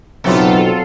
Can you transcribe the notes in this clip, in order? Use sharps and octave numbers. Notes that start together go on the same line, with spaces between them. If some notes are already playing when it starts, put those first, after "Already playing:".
B1 C#3 E3 F#3 B3 C4 F4 A4